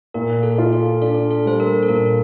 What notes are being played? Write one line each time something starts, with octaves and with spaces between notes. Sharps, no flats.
A#2 A#4
A4
F4
A4
D4 A4
A4
G3 C5
A#4
A4
A#2 A#4